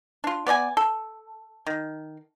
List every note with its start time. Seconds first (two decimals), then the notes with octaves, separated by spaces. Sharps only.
0.24 D4 F4
0.47 B3 D5 D#5 G#5
0.77 A4
1.67 D#3